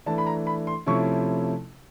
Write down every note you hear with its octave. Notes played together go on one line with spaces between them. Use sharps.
E3 A3 D4 A5
B5
A#5
B5
C6
C3 F3 A3 C#4 E4 C#6